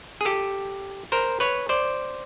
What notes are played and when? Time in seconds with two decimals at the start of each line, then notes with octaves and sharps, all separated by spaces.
0.21 G#4
0.25 G4 A4
1.12 A#4 C5
1.40 B4 C#5
1.69 C5 D5